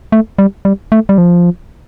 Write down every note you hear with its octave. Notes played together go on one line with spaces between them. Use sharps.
A3
G3
G3
A3
G3
F3